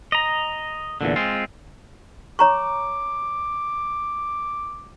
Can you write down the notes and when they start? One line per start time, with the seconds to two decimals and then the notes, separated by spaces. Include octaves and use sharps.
0.12 D#5 A#5
1.01 E2 A#2 D3
1.16 G#3 C4 F4
2.39 C#5 A#5 C#6 D6